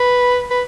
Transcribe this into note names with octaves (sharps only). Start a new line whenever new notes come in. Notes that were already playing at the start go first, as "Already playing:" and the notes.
Already playing: B4
B4